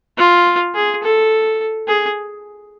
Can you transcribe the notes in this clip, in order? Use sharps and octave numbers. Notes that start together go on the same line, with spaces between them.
F4
G#4
A4
G#4